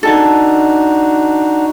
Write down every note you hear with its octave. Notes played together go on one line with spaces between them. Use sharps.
D4 D#4 F#4 A4 G#5 A5